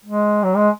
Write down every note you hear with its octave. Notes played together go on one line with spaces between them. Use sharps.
G#3
F#3
G#3